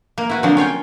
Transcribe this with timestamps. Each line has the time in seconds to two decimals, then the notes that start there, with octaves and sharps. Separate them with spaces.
0.18 A#3
0.29 E4 F#4 B4
0.43 D3 F3 F#3 A#3 C4 D4
0.57 C#4 F4 C#5 G5